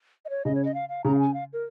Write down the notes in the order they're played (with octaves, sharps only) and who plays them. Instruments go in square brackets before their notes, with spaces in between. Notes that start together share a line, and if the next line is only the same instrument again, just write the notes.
[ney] D#5
C#5
[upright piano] C#3 [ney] D#5
[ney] C#5
D#5
F5
F5
[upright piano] C#3 [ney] A#5
[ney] F5
G#5
F5
A#4